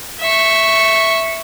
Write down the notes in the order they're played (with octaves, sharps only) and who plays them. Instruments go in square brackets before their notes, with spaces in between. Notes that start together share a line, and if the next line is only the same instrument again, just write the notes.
[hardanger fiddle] E5 C#6